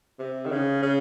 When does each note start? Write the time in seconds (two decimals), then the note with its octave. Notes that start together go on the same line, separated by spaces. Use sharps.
0.19 C3
0.45 D#3
0.51 C#3
0.82 C#3